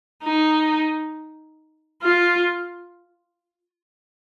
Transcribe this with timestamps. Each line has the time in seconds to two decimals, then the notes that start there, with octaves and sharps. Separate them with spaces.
0.23 D#4
2.02 F4